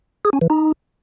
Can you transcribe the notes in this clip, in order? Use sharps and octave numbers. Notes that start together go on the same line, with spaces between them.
G#4
C#4
E3
D#4